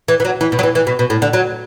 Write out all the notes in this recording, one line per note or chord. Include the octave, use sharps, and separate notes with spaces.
E3
E3
F#3
E3
B2
F#3
E3
E3
B2
B2
A2
D3
F#3